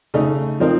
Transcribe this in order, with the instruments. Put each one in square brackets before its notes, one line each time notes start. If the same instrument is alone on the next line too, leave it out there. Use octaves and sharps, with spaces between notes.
[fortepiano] C#3 A3 D#4
F3 C4 D#4 A#4